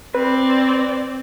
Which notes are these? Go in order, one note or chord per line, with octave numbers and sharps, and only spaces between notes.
C4 B4 D5